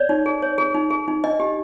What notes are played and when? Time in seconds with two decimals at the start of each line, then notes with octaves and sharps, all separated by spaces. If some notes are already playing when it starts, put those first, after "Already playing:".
Already playing: C#5 D5
0.09 D#4
0.26 G#4
0.42 C#5
0.58 G#4
0.74 D#4
0.90 G#4
1.08 D#4
1.24 D4 D#5
1.40 G4